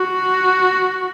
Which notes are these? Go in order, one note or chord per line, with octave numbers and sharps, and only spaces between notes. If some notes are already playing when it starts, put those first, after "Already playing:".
Already playing: F#4